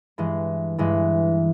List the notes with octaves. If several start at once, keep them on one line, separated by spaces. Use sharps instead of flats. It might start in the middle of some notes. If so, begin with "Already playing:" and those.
G2 E3 G#3
G2 E3 G#3